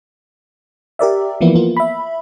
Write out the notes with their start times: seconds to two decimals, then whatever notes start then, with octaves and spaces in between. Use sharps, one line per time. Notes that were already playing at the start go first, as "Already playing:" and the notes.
0.99 G4 A#4 D5 E5
1.41 E3 F3 A#3 B3 E4
1.55 A#3 B3 F4
1.77 E5 B5